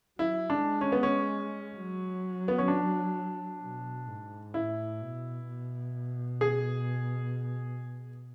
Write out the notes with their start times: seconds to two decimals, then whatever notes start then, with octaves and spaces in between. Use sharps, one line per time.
0.19 F#3 E4
0.50 G#3 D4
0.81 C#4
0.92 B3
1.03 C#4
1.75 F#3
2.48 B3
2.58 C#4
2.68 D4
3.61 B2
4.08 G#2
4.54 A2 E4
5.02 B2
5.48 B2
6.41 G#4